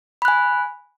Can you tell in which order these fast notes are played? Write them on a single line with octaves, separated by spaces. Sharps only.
B5 F#6 G#5